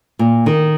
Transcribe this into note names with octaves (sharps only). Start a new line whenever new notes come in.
A#2
D#3